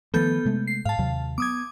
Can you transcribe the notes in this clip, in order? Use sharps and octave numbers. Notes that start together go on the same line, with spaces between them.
D#3 F3 A3 B3 A4 G6
C3 G#3 A3
C7
G#2 F5 A5
D#2 C3 F#3
B3 D6 D#6 G#6